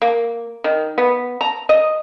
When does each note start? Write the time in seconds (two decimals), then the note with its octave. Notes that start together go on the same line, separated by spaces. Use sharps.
0.02 A#3
0.64 D#3
0.98 B3
1.41 A#5
1.69 D#5